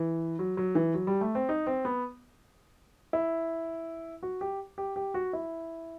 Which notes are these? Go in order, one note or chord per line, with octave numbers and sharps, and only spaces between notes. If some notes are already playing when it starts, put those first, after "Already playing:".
Already playing: E3
F#3
F#3
E3
F#3
G3
A3
C4
D#4
C4
B3
E4
F#4
G4
G4
G4
F#4
E4